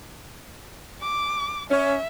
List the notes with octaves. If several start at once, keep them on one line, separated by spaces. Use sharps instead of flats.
D6
C#4 E5